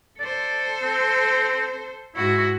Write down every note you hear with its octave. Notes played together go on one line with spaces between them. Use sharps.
A4 C5 D5
C4
G#2 E4 F#4